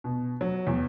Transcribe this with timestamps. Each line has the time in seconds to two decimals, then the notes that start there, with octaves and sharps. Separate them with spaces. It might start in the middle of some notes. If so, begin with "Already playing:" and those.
0.04 B2
0.41 F#3
0.67 E2